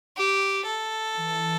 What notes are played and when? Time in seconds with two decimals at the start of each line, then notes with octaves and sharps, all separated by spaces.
0.17 G4
0.65 A4
1.14 E3